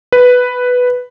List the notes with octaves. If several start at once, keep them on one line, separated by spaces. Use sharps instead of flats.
B4